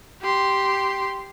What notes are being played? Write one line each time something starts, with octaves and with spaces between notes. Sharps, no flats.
G4 C6